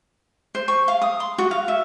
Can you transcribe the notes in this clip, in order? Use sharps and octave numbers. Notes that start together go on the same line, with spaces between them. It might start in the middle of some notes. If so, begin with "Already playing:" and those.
C5
C#6
F5
D#6
C6
F#4
F5
E5